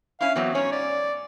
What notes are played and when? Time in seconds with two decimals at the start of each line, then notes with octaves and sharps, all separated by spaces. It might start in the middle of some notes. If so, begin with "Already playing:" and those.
0.21 C#4 E4 F5
0.36 E3 F#3 B3 C4
0.55 G#2 C#4 C#5
0.72 D5